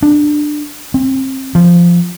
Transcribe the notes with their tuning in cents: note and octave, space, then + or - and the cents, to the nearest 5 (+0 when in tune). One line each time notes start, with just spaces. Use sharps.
D4 +15
C4 +30
F3 -10